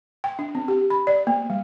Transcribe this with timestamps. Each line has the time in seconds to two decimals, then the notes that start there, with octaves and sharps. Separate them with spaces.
0.24 G5
0.39 D4
0.55 C4
0.68 G4
0.90 B5
1.07 D5
1.27 A#3
1.50 G3